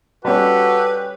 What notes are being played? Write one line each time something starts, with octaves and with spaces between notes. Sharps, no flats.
G3 C#4 F#4 G4 A4 B4